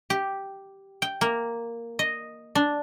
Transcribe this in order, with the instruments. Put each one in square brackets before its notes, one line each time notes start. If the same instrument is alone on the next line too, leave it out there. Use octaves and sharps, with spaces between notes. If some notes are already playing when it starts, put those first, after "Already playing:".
[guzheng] G4
G5
A#3
D#5
D4